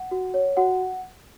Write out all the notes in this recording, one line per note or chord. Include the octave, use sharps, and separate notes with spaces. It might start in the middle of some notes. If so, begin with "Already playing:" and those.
Already playing: F#5
F#4
C#5
F#4 F#5